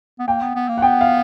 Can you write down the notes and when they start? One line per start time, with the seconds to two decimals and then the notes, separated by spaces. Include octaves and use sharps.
0.19 B3
0.28 A#3 G5
0.42 B3
0.55 B3
0.69 A#3
0.78 F#5
0.82 B3 G5
1.01 F5